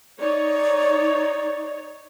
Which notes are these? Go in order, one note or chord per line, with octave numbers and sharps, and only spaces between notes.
D#4 C#5 D5